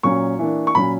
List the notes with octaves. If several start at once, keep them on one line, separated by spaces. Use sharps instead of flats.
A#2 F#3 C#4 C#6
E3 A#3 D4
C#6
A#2 F#3 C#4 B5